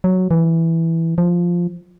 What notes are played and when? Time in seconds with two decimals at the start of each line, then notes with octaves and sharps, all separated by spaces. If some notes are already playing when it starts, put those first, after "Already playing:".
0.04 F#3
0.31 E3
1.18 F3